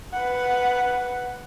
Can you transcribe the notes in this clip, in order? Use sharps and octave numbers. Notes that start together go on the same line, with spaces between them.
B4 F#5